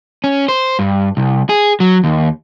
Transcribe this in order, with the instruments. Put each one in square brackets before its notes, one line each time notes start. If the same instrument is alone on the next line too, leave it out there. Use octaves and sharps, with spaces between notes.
[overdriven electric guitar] C#4
C5
G2
C2
G#4
F#3
D#2